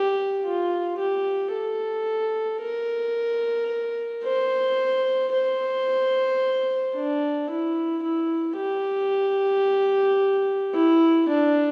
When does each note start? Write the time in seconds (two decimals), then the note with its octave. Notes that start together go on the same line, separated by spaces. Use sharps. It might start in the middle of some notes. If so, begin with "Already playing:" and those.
Already playing: G4
0.45 F4
0.99 G4
1.53 A4
2.62 A#4
4.24 C5
5.32 C5
6.96 D4
7.50 E4
8.04 E4
8.57 G4
10.74 E4
11.29 D4